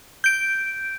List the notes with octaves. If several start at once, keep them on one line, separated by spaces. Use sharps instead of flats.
G6 D7